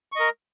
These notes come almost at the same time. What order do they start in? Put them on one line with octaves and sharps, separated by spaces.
C#6 D#5 A#4